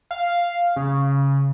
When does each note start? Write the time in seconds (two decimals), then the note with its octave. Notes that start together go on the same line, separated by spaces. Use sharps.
0.11 F5
0.76 C#3